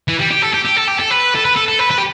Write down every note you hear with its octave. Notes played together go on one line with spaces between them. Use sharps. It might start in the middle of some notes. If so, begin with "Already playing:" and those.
E3
G3
G4
A4
G4
G4
A4
G4
A4
B4
A4
B4
A4
A4
B4
B4
G4